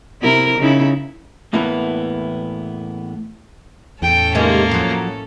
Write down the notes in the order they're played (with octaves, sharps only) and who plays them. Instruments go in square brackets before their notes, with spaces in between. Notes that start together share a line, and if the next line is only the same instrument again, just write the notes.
[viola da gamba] C3 E4 A#4
C#3 D#4 E4
[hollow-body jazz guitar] E2 A2 E3 A#3 B3 E4
[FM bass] E2 [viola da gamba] A2 C#4 A4 [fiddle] G5
[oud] C3 D#3 G#3 [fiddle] A#3
[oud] F3 F#3